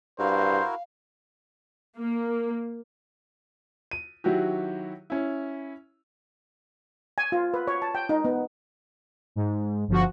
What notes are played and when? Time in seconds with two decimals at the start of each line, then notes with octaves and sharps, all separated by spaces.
0.19 G2 E4 F#4 A#4 C5 F5
1.98 A#3
3.91 D#7
4.24 D#3 F#3 E4 F#4 G4
5.10 C#4 E4
7.18 G#5
7.32 F4
7.54 B4
7.67 C#5
7.82 A5
7.95 G5
8.09 D#4
8.25 B3
9.36 G#2
9.88 G1 F3 F#4